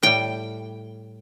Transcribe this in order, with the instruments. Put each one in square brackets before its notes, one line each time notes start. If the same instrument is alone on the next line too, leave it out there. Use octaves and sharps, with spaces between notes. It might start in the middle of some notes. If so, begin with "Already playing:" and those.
[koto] A2 G3 G5